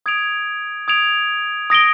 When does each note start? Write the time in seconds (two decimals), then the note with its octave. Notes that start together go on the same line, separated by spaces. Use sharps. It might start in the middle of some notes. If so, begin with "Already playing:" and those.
0.06 D#6 G#6 D7 F7
0.88 D#6 G#6 D7 F7
1.70 D#6 A#6 D7 G7